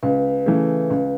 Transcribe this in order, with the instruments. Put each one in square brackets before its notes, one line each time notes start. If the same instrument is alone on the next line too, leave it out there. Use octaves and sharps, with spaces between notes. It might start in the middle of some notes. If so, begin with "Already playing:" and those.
[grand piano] C#2 [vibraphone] B4
[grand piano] C#3 E3 A3
C#2